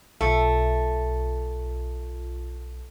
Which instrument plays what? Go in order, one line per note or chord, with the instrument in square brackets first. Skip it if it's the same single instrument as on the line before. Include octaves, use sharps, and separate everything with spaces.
[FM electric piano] B1 F4 [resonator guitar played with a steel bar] A3